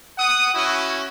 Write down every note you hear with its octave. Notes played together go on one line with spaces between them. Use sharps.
F#5 D#6
C#4 E4 F#4